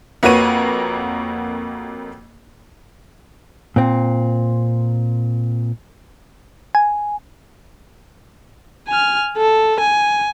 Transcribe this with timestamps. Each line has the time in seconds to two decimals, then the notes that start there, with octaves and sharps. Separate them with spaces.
0.23 F2 A#3 F#4 B4 C#5 D#7
3.76 A#2 C4
6.75 G#5
8.88 G#5 F6
9.38 A4
9.80 G#5